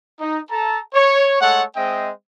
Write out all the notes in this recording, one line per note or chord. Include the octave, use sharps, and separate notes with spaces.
D#4
A4 A5 A#5
C#5
G#3 A3 A4 C#5 F#5
G#3 C4 C5 D#5 E5 G5